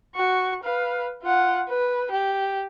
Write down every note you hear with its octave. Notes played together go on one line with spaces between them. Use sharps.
F#4 C#6
B4 F5
F4 F#5
B4
G4